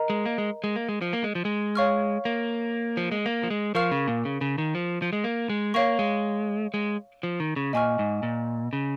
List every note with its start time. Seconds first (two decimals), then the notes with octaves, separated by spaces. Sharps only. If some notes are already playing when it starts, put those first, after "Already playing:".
Already playing: A#4 D#5 A#5
0.10 G#3
0.26 A#3
0.38 G#3
0.64 G#3
0.76 A#3
0.89 G#3
1.01 F3
1.13 A#3
1.24 G#3
1.35 F3
1.45 G#3
1.75 C#5 F5 C#6 F6
2.25 A#3
2.97 F3
3.12 G#3
3.26 A#3
3.43 F3
3.50 G#3
3.75 F3 A#4 F5 C#6 F6
3.91 C#3
4.08 A#2
4.25 C#3
4.41 C#3
4.58 D#3
4.75 F3
5.02 F3
5.13 G#3
5.24 A#3
5.49 G#3
5.74 A#3 C#5 F5 C#6
5.99 G#3
6.74 G#3
7.23 F3
7.40 D#3
7.56 C#3
7.73 A#2 D#5 G#5 C#6 F6
7.99 G#2
8.23 A#2
8.73 C#3